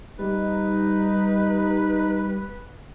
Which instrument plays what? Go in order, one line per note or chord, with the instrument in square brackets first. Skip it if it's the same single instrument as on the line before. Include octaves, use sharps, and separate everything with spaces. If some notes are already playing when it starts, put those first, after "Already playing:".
[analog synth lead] G3 [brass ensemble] D#4 [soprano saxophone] B4